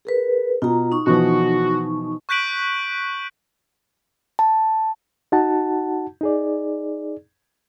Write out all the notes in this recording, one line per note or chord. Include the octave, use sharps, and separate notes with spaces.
G#4 A#4 B4
B2 F4 A#5
D#4 C#6
B2 E3 F3 F#4
C#6 F#6 G6 B6 D7 F#7
A5
D#4 F#4 F#5 A5
D#4 G#4 D5